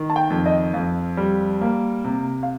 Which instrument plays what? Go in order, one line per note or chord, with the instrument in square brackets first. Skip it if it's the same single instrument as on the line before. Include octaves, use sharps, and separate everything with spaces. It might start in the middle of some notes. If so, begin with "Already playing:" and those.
Already playing: [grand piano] D#3
[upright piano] A5
G5
[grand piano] F2
[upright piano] D#5
[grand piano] F2 [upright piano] F5
[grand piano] G3
A#3
C3
[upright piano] F5